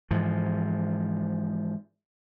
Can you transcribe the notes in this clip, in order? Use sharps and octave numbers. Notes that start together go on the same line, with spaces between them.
G#2 E3 F3